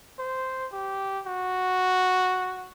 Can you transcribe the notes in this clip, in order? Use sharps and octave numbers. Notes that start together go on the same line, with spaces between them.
C5
G4
F#4